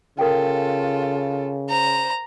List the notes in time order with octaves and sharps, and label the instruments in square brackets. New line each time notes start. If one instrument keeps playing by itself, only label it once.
[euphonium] C#3 [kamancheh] F4 A4 [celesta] A#4 G5
[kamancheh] C5 [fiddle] A#5